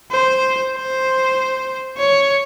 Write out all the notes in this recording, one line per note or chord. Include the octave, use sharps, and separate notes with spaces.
C5
C5
C#5